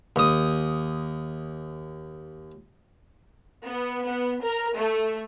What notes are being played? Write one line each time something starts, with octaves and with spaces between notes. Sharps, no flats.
D#2 D#6
B3
B3
A#4
A3